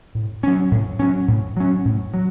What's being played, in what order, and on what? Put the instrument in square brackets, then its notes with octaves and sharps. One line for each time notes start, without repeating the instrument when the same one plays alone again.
[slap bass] A2
F#3 C#4
A2
F#3 C#4
A2
F#3 C#4
A2
F#3